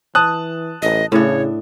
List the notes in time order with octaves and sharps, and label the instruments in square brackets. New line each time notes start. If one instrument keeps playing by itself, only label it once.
[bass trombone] E3 [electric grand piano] A5 D#6 F#6
[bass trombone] A1 [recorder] D#5
[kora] A2 D4 [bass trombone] C#3 [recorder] C#5